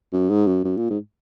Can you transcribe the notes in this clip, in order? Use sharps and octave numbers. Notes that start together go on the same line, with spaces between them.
F#2
G#2
F#2
F#2
A#2
G#2